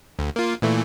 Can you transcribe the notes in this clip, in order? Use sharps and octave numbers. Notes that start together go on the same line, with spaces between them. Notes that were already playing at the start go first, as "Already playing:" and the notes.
D2
A#3 F4
A#2 E3 A3